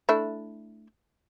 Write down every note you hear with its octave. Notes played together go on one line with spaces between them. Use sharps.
A3 D4 E4